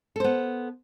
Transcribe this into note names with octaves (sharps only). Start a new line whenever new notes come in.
B3 A4 C5